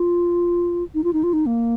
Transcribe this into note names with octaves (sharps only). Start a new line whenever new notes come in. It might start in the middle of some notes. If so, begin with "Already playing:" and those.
Already playing: F4
D#4
F4
D#4
F4
D#4
A#3